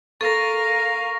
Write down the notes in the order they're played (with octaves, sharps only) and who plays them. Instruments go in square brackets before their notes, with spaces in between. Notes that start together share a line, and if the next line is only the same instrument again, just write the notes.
[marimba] A4 [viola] A#4 F5 [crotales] C#6 A#6